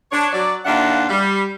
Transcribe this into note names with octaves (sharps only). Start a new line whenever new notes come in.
D4 C#5
F#3 D5
D#2 A#3 D4 F4 E5 F#5
G3